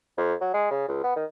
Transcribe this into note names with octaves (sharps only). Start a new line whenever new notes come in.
F2
F#3
G#3
C#3
C#2
B3
D#3